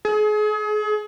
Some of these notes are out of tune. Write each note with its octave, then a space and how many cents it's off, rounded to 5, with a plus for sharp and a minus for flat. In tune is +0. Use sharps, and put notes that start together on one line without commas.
G#4 +35